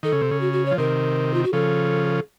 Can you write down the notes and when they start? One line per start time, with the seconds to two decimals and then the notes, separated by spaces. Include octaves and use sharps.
0.03 D#3 A4
0.12 C#3
0.21 C3
0.31 C#3
0.41 F#4
0.53 F#4
0.65 C#5
0.71 F3
0.78 C3 D#3 A#4
1.34 F4
1.44 F#4
1.53 C#3 F3 A4